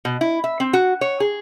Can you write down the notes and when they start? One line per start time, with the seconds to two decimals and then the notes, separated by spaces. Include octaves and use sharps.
0.05 B2
0.21 E4
0.44 E5
0.60 C4
0.73 F#4
1.01 C#5
1.20 G#4